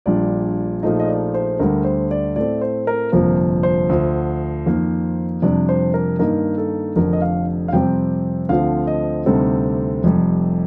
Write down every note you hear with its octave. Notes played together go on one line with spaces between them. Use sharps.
A#1 A#2 G3 D4 D5
A#1 A#2 F3 A3 D#4 D#5
D#5
D5
C5
D2 D3 G3 A#4
C5
D5
A2 A3 C4 D5
C5
A#4
G1 F2 C3 F3 A#3 A#4
C5
D2 D3 F3
F2 D#3 A#3
F2 C3 G3 D4 D5
C5
A#4
G2 D#3 A#3 D#4 A#4
A4
F1 F2 D3 A#4
D#5
F5
F5
F2 C3 G3 C4 G5
D2 D3 F3 C4 F5
D#5
D2 C3 G3 C4 D#4 A4
F1 F2 C3 G3